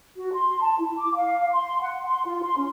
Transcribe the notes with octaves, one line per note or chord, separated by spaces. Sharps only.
F#4
C6
A5
E4
D6
F5
C6
F#5
C6
F4
C6
C#4